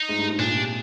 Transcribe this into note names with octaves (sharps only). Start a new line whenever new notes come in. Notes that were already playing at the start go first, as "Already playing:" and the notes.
Already playing: D#4
G#2
G2
G#2
A#2 D4
C3